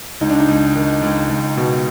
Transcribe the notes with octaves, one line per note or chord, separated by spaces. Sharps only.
C#2 D#4
D4
D#4
C#2
D#3
C#2
C#2
B2